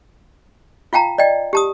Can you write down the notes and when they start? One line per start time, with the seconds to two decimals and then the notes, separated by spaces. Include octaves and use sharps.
0.93 F4 F5 G5 A5 A#5
1.18 D5 D#5 G5
1.53 G4 A5 D#6